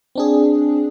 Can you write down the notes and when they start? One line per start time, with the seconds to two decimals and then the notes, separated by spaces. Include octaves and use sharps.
0.15 C4 D4 G#4